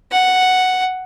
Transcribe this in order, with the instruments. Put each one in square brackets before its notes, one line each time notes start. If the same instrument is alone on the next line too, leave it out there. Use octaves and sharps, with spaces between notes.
[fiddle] F#5